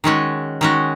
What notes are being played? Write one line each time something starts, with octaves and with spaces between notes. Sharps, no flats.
D#3 G#3 C#4 F#4
D#3 G#3 C#4 F#4